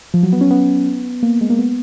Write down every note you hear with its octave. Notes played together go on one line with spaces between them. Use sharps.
F3
F#3
B3
C#4
B3
A#3
G#3
A#3
B3